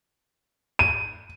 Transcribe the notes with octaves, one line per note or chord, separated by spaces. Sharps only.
D#7